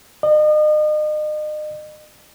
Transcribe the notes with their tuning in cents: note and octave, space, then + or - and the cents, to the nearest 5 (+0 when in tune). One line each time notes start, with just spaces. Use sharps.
D#5 -40